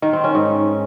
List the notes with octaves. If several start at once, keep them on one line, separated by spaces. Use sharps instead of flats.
D#3
C4
C#4
G#2